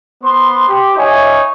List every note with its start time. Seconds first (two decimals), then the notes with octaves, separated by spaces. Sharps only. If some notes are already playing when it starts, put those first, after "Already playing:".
0.24 B3 C5 C6
0.68 G4
0.97 D#4 C#5 E5 G#5